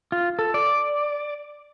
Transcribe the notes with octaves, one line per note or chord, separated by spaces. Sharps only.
F4
A4
D5